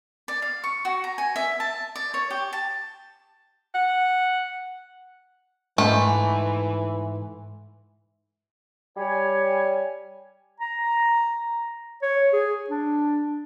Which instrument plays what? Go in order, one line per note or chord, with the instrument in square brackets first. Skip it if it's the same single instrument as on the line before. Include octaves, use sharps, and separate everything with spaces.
[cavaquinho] D5
F5
C#6
F#4
A#5
G#5
E5
A5
D5
C#5
G4
A5
[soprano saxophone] F#5
[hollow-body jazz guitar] G#2 [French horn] E3 [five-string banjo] A3
[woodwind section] G3 C#5 G#5
[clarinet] A#5
C#5
G#4
D4